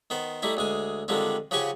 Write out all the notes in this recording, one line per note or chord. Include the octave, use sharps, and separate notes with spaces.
D#3 B3 C5
G3 A3 D#4 E4
D2 G#3 G#5
D3 D#3 F3 G3 G#3 C4
C#3 F3 G4 F#5 G#5 C#6